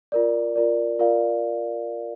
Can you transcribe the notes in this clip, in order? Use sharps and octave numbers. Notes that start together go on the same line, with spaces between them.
F4 A#4 D5
F4 A#4 D5
F4 A#4 D5 F5